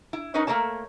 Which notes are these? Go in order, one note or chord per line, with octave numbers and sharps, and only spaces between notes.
E4
C#4 D#4 A#4 B4 C#5 D#5
A3 A#3 A#4 C#5 A5